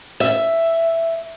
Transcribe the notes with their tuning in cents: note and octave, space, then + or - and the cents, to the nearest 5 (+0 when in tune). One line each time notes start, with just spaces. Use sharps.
E5 +5